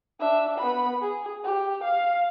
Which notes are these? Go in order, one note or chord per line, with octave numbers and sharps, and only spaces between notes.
D4 E5
B3 B5
G#4
G4
F5